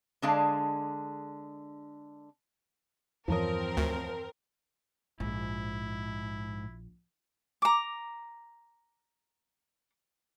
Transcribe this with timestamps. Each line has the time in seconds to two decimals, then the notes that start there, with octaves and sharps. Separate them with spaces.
0.22 D3 G#3 D4 G#4 F5 A5
3.28 E2 G2 E3 F3 C4 A#4 C#5 D#6
3.77 D2
5.20 A#1 G#2 E4
7.62 A#5 D6